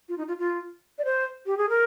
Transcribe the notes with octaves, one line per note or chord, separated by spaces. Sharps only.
F4
D#4
F4
F4
D5
C5
G4
G#4
A#4